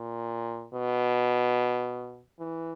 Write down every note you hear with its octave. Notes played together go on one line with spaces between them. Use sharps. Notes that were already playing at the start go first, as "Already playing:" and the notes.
Already playing: A#2
B2
E3